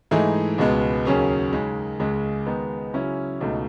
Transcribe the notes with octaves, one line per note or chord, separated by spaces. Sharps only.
G#2 E3 A3 D#4 G#4
C#2 B2 G#3 B3
D#2 C#3 F#3 C#4 G#4
C#3 G#3 D#4
C#2 C#3 G#3
D#3 G#3 B3 D#4
C#3 F#3 C#4 E4
C#2 B2 A3 D#4